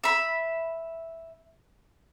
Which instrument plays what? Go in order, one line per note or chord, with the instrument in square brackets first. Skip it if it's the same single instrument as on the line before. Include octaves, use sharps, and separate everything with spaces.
[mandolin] E5 B5